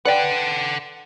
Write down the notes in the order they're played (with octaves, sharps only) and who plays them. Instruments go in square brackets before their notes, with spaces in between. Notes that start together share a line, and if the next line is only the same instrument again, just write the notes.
[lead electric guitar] A4 F#5 [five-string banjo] B4 D5 G5